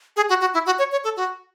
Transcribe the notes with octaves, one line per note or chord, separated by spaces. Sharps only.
G#4
F#4
F#4
E4
F#4
C#5
C#5
A4
F#4